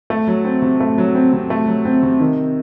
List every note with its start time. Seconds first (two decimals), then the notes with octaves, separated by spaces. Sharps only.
0.10 A3
0.28 F#3
0.45 C4
0.62 C3
0.80 A3
0.98 F#3
1.15 C4
1.33 C3
1.50 A3
1.67 F#3
1.85 C4
2.03 C3
2.20 D#3